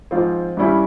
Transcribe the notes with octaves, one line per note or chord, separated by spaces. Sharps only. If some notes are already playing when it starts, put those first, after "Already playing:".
G#2 F3 C4 F4
G2 G3 C#4 E4